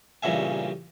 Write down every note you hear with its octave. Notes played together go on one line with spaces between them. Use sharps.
A1 G2 A#2 C#3 E5 G#5